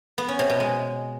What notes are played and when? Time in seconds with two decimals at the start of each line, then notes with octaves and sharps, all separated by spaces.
0.18 B3
0.28 C#4
0.39 C3
0.50 B2
0.60 G#3